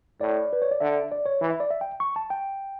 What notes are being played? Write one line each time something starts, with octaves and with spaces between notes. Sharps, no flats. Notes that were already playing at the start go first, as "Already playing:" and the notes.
A2 D5
B4
C#5
D5
D3 E5
D5
C#5
E3
E5
D5
E5
G5
C#6
A5
G5